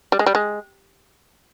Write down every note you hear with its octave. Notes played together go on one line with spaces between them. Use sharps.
G3
G#3
G3
G#3